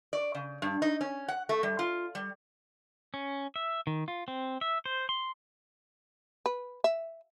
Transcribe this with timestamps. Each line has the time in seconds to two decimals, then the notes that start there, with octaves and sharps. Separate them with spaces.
0.13 D5
0.35 C#3
0.62 G2
0.82 D#4
1.01 C#4
1.28 F#5
1.49 A3
1.63 G3
1.79 F4
2.15 G3
3.14 C#4
3.56 E5
3.87 D#3
4.08 F4
4.28 C4
4.61 E5
4.86 C5
5.09 C6
6.46 B4
6.84 E5